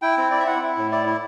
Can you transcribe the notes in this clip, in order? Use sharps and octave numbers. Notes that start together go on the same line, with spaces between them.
E4 G5
C4
E4 D5
E5
E4 F#5
E4
A2
E4 D5
E4